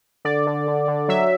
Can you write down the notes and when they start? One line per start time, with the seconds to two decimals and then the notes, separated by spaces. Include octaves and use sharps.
0.25 D3 D5
0.47 D3
0.68 D3
0.88 D3
1.08 F#3 E5